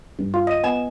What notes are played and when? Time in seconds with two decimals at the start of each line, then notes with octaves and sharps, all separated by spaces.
0.19 G2
0.34 F4
0.47 D#5 D#7
0.63 B3 G#5 G#6 E7